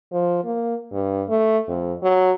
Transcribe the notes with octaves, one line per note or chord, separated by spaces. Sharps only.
F3
A#3
G2
A3
F2
F#3